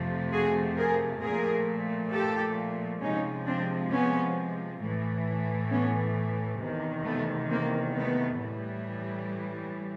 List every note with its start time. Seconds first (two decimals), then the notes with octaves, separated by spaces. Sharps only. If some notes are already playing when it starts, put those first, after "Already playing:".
Already playing: F2 C3 F3 A3
0.33 F#4 G#4
0.78 G#4 A#4
1.22 A#2 F3 A3 G#4 A#4
2.12 G4 A4
3.02 C3 F3 G#3 C#4 D#4
3.46 C4 D4
3.91 B3 C#4
4.81 A2 E3 A3
5.70 B3 C#4
6.60 E2 C3 D#3
7.05 A3 B3
7.49 A#3 C4
7.94 A3 B3
8.39 A2 E3 G3